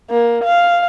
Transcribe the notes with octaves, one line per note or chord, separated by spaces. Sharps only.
A#3
F5